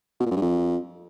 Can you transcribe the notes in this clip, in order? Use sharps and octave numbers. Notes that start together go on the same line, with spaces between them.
B2
A#2
F#2
G2
F2